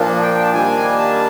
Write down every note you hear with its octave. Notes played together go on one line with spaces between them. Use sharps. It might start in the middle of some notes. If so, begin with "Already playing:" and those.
Already playing: A#2 F3 A#3 D4
G5
A5
D#3 G3 A#3 D4 G#5
A5